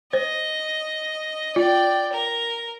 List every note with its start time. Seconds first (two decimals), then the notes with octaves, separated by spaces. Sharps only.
0.13 C5 D#5
1.56 F4 D5 G5
2.12 A#4